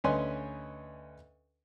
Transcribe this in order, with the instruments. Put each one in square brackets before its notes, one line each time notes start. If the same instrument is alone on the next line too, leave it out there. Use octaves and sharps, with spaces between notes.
[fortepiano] D2 C#4 B4 D#5 G#5 C6